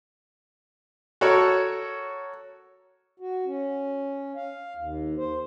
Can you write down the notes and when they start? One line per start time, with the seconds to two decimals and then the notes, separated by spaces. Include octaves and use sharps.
1.21 F#4 A4 A#4 C#5
3.20 F#4
3.46 C#4
4.36 F5
4.77 D#2
5.18 C5